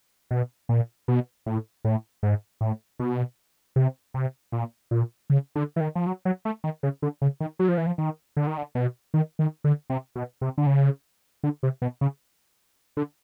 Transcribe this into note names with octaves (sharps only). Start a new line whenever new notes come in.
B2
A#2
B2
A2
A2
G#2
A2
B2
C3
C3
A#2
A#2
C#3
D3
E3
D#3
F3
F#3
F#3
A3
D#3
C#3
D3
C#3
D#3
F#3
F3
E3
F3
D#3
D3
D#3
D3
B2
D#3
D#3
D3
C3
B2
C3
D3
C#3
D3
C3
B2
C#3
D3